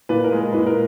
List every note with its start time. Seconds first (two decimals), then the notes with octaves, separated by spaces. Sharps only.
0.09 A#2 B4
0.24 A#4
0.32 G#3
0.39 A#4
0.52 A#2 B4
0.66 A#4